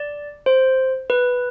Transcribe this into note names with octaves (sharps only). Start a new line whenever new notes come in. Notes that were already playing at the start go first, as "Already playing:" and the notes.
Already playing: D5
C5
B4